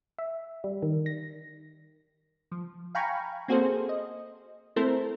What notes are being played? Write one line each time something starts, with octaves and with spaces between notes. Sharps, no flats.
E5
G3
D#3
A#6
F3
F5 G5 G#5 A#5 B5 C#6
A#3 C4 F#4 G#4 A4 C5
D#5
A3 C4 E4 A4 A#4 C5